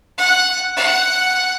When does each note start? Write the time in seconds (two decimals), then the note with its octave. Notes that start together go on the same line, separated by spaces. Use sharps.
0.18 F#5
0.77 F#5